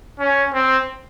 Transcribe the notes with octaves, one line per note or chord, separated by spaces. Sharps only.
C#4
C4